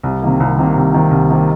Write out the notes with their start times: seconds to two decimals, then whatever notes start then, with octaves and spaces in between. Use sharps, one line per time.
0.03 C2
0.22 C3 D#3 A#3
0.40 C2
0.58 C3 D#3 A#3
0.76 C2
0.93 C3 D#3 A#3
1.11 C2
1.30 C3 D#3 A#3